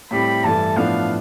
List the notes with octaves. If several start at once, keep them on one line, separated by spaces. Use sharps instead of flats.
A2 G3 C4 G4 B5
G2 E3 A3 E4 A5
A2 F3 B3 D4 F5